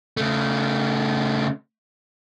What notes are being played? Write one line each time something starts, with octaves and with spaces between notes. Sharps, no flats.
C#3 A3